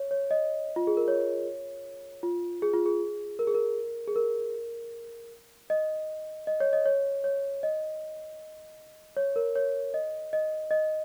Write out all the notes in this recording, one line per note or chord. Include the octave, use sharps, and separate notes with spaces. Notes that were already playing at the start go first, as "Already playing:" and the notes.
Already playing: C#5
C#5
D#5
F4
G#4
A#4
C#5
F4
G#4
F4
G#4
A#4
G#4
A#4
G#4
A#4
D#5
D#5
C#5
D#5
C#5
C#5
D#5
C#5
A#4
C#5
D#5
D#5
D#5